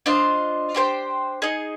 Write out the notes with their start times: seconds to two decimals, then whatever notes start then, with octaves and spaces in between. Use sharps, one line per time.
0.06 D4 F4 C5 D#5
0.75 D4 G4 C5 G5
1.42 D#4 G#4 D#5